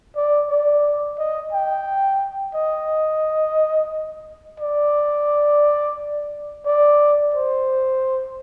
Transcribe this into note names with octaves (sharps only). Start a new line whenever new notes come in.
D5
D5
D#5
G5
D#5
D5
D5
C5